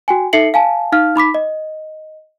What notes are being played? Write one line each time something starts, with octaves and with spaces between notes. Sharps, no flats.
F#4 G5 G#5
D#4 A4 E5 C7 C#7 F#7
F5 G#5 A5
D#4 F5 F6
D#4 B5 D6 B6
D#5